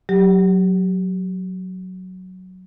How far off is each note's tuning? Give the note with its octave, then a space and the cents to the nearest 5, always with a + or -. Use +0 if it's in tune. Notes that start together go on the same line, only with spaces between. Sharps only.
F#3 +0 G4 +0